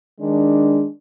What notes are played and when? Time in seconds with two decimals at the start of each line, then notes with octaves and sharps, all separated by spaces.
0.20 D#3 G#3 D4